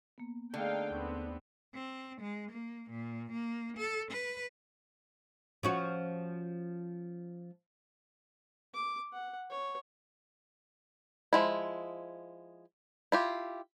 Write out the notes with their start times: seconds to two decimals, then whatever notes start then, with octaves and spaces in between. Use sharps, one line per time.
0.18 A#3 B3
0.54 D3 A3 D#4 G#4 F5 G5
0.90 D#2 B3 C4 C#6
1.74 C4
2.21 G#3
2.51 A#3
2.90 A#2
3.32 A#3
3.77 A4
4.11 B4
5.63 F3 C#4 F#4
8.74 D6
9.13 F#5
9.50 C#5
11.33 F3 G#3 E4
13.12 E4 F4 G4